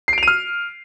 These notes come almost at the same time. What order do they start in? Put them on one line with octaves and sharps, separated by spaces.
C7 D7 F7 D#7 F6